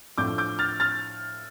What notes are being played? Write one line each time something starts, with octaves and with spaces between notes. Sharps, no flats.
A2 F3 D4 D6 G6
D6 G6
F6 A6
F6 A6